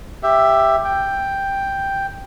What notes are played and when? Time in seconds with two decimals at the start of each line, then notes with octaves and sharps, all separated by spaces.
0.23 G4 E5
0.85 G5